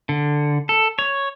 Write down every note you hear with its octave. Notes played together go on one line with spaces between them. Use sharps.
D3
A4
C#5